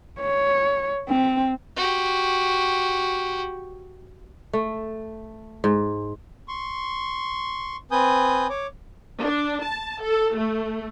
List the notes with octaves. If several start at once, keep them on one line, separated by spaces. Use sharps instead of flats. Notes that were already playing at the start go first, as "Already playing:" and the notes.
C#5
C4
F#4 G4
A3
G#2
C6 C#6
C4 B4 G#5 D#6 G6
C#5 D6
D4
A5
A4
A3